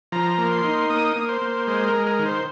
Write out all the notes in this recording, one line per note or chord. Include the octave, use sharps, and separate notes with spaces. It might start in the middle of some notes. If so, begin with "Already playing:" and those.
F3 A#5
A#3
C6
D#4
A#3 D#6
A#3
C5
A#3
G#3 C5
A#4
G#3
A#4
D#3
C5